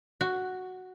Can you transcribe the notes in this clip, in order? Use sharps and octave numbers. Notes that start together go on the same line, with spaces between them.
F#4